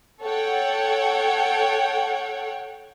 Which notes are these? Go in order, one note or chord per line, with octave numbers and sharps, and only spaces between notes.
A4 C#5 F#5 G5